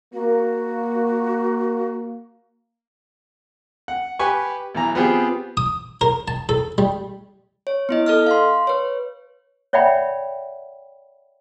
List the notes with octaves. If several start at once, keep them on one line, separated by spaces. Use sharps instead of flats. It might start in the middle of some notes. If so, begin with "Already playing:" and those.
A#3 F#4
F#5
G4 B4 G#5 C#6
B1 E3 A#5
B3 C4 F4 G4 G#4 C5
D#6
A#4
A5
A4
G3
C#5
B3 E4 D#5
A4 D#5 F6
F5 C6
B4 C#5
C#5 D5 E5 F#5 G5 B5